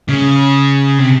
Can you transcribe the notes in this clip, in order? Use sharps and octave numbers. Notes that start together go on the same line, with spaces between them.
C#3
C3